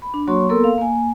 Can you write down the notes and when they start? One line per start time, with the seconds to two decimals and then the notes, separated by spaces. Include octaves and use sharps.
0.02 B5
0.14 D4
0.27 F#3 A#3 F#4 C#5 C6 C#6
0.49 A#3 B3 A4 A#4 C6 E6
0.64 F5
0.78 A#3 G#5